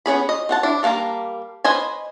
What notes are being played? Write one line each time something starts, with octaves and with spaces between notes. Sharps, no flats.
B3 C#4 G#4 B5
D#5
C4 F#5 A5
D4 E4
G3 A#3 F5 A5 A#5
B4 C5 D#5 G#5